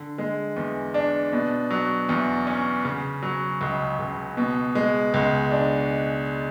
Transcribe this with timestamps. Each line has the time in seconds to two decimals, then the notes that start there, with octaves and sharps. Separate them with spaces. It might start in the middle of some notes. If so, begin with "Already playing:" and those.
Already playing: D3
0.18 G#3
0.56 E2
0.94 D4
1.32 B2
1.70 F#3
2.09 E2
2.47 C#4
2.85 C#3
3.22 F#3
3.61 C#2
3.99 C#2
4.37 B2
4.75 G#3
5.14 C#2
5.51 D4